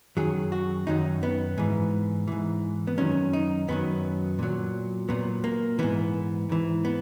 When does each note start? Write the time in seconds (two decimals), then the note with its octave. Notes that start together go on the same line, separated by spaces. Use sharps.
0.17 F#2 D#3 F#3 G#4
0.52 F#4
0.87 F#2 D#3 F#3 D#4
1.23 B3
1.58 G#2 E3
2.28 G#2 E3
2.87 B3
2.98 F#2 D#3 F#3 C#4
3.33 D#4
3.68 F#2 D#3 F#3 B3
4.39 A#2 F#3
5.09 A#2 F#3 B3
5.44 A#3
5.79 G#2 E3 B3
6.49 G#2 E3
6.85 B3